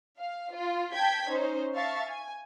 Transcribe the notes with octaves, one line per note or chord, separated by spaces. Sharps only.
F5
F4
G5 A5 G6 G#6 B6
C#4 D#4 C5
E5 F5 A5 C#6 A6
G#5